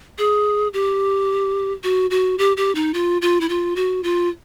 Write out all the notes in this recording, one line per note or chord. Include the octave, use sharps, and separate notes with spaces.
G#4
G4
F#4
F#4
G4
G4
D#4
F4
F4
E4
F4
F#4
F4